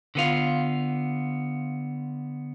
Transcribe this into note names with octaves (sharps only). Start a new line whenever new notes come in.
D3 B3 F4